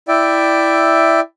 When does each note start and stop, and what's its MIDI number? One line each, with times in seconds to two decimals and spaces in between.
0.08 1.20 64
0.08 1.20 74
0.08 1.20 76
0.08 1.20 79